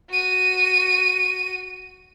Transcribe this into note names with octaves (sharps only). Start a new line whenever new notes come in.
F#4 D#7